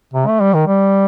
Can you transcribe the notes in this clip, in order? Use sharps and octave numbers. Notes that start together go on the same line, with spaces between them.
C3
A3
G3
D#3
G3